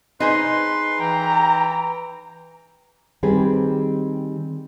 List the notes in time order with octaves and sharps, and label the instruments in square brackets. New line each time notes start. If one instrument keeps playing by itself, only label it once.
[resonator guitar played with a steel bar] D#4 G#4 C5 [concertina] B4 C6
[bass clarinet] E3 [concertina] G5 [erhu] A#5
[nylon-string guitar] D#3 G3 C4 G4 G#4 B4